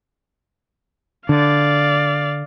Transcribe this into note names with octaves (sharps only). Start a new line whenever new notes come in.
D3 D5 F5